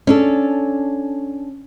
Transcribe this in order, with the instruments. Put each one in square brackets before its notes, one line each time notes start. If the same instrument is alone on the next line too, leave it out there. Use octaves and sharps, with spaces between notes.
[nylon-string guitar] C#4 D4 A4